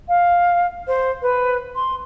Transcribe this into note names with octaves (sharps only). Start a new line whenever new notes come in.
F5
C5
B4
C6